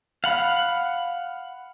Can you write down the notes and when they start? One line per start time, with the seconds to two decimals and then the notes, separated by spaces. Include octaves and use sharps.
0.24 F5 F#5 B5